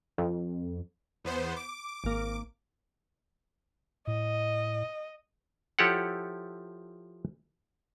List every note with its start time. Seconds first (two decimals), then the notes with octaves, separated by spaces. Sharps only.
0.18 F2
1.24 E2 B3 C5
1.56 D6
2.04 G#1 A#3
4.07 A2 D#5
5.79 F3 E4 G4 A4 C#5 F#5